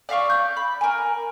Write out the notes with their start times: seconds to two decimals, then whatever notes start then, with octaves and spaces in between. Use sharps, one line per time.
0.09 D5 E5 F5 C#6
0.30 G6
0.57 B5
0.81 A#4 G#5